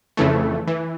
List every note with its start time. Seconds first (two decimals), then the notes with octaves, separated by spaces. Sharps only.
0.17 F2 C#3 E3 A3
0.67 E3